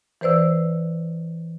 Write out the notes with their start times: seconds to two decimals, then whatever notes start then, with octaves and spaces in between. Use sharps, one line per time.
0.21 E3 B4 C5 D5 E6